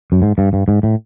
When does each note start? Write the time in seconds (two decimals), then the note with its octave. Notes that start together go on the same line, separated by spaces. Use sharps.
0.12 F#2
0.22 G#2
0.38 G2
0.53 G2
0.68 G#2
0.83 A2